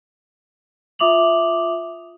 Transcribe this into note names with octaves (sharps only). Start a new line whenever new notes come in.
F4 E5 D6 D#6 F7 F#7